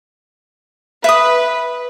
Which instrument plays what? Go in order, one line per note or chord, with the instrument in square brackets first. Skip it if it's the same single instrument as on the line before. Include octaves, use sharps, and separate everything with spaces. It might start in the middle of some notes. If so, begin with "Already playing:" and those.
[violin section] B4 [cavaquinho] E5 D#6